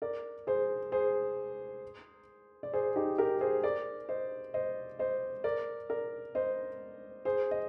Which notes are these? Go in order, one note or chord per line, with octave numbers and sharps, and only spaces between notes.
A#4 D5
G#4 C5
G#4 C5
D5
G#4 C5
D#4 G4
G4 A#4
G#4 C5
A#4 D5
C5 D#5
C5 D#5
C5 D#5
A#4 D5
A#4 D5
C5 D#5
G#4 C5
D#5